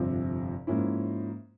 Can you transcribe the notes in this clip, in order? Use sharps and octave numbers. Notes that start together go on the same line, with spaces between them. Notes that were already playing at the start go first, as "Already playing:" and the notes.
Already playing: G1 F2 C3 F3
G#2 F3 A#3 C#4 E4